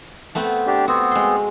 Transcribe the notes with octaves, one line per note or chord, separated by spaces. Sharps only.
A3 B3 C4
D4 G4
B3 C4 F#4
G#3 C6